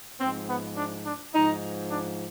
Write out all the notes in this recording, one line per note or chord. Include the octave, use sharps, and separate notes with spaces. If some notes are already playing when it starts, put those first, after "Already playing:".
G#2 F3 C4
B3
D4
D4
G#2 F3 D#4
D4